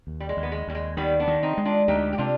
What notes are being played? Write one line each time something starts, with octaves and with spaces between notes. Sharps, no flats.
D#2
G3
G#3
D#2
B3
G#3
D#2 G3
G#3
D#3 G3 B3
B3 D4
D#3
C4 D#4
G#3
D4 F4
D2 D#4 G4
G4
C3 D4 F4